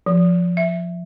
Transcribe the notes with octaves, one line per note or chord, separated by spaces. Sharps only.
F3
E5